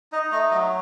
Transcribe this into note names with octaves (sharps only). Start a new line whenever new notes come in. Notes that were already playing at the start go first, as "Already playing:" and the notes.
D#4 D#5
A3 D#5
F#3 D#5